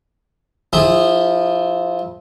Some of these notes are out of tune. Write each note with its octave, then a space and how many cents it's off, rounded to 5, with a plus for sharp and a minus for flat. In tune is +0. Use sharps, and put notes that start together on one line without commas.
F3 +5 E4 -25 G#4 -25